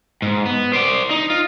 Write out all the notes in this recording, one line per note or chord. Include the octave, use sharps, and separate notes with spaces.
G#2
B3
C5 D5
D#4
F4